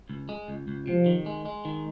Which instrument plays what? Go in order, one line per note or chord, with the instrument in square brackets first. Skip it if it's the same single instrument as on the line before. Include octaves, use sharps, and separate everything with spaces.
[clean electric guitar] C#2
G#3
C#2
C#2
[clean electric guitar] C3 [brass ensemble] F3
[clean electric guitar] D#3
G#3
G#3
D#3